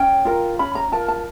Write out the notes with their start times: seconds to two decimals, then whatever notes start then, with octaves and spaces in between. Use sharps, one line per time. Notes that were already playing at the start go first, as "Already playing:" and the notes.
Already playing: C#4 G5
0.25 F4 A#4
0.59 C#4 B5
0.75 A#5
0.92 F4 A#4 A5
1.08 A5